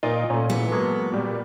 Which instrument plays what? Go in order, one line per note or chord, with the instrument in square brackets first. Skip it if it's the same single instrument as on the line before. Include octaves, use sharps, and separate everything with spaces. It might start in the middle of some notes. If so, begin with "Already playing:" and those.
[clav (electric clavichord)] A#2 F4 D#5 [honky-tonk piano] D#4 A#4
[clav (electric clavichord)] A#2 [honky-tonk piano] A3 C#4
[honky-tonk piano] E3 G#3 [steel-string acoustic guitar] B3
[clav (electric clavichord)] F#3 G#3 A#3 [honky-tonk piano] A4
[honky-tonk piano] A#2 G3